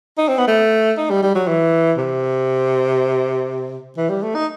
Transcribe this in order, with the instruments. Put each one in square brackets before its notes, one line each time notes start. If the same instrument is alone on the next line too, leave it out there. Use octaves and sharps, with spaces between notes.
[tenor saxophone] D#4
C4
B3
A3
D#4
G3
G3
F#3
E3
C3
E3
G3
A3
D#4